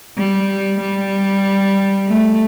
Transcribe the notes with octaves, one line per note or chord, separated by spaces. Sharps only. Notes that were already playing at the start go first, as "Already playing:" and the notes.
G3
G3
A3